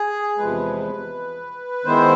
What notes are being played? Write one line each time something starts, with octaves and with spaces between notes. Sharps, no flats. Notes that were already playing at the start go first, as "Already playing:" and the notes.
Already playing: G#4
E2 C3 F3 G#3 B4
D#3 G#3 B3 E4 C5